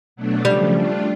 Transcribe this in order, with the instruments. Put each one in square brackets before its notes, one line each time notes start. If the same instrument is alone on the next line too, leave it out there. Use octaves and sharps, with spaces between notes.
[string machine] B2 F#3 A3 D4
[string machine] C#3 F3 A3 [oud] G3
[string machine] A3 D4 F4